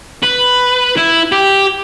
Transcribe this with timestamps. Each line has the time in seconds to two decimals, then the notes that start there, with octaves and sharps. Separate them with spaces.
0.23 B4
0.97 E4
1.32 G4